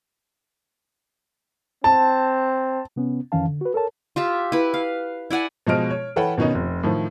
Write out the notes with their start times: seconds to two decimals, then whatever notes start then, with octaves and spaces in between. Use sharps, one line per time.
1.84 C4 A5
2.96 C3 B3 C#4
3.32 F2 D#3 E3 C#4 F5 A5
3.48 D3
3.61 F#4 B4
3.74 A4 A#4 C#5 A5
4.16 F4 G4 E5
4.52 E4 B4
4.74 F5
5.31 E4 D5 F#5 G#5
5.67 B2 F3 G#3 D#5 F6 D7
5.91 C#5
6.16 E3 A4 B4 C#5 F#5 G5
6.38 B2 D#3 B3 C#4 D#4
6.55 F1
6.83 A2 D#3 F3